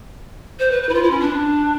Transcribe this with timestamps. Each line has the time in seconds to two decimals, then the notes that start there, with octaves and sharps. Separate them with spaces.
0.59 C5
0.71 B4
0.83 B4
0.89 E4
0.94 F4
1.03 E4
1.11 C#4
1.20 D4